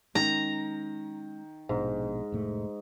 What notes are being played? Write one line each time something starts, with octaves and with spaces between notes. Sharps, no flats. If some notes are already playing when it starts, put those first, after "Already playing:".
D#3 G#3 B3 C#4 A#5
A#1 G#2 B2 D4
F1 A2 A3